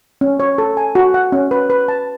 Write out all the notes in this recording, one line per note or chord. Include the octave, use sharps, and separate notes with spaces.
C#4
C#5
A4
G#5
F#4
F#5
C#4
B4
B4
A5